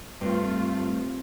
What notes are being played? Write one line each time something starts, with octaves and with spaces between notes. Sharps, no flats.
G2 A3 C4 F4